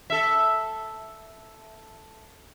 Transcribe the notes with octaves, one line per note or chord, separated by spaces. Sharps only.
A4 E5